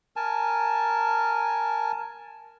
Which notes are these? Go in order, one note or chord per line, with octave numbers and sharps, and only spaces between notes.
A#4 G#5 A5